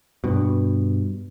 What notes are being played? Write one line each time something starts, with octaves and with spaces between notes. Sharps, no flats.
G2 B2